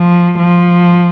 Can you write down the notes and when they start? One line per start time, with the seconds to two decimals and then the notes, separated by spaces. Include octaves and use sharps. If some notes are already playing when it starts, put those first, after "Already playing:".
Already playing: F3
0.39 F3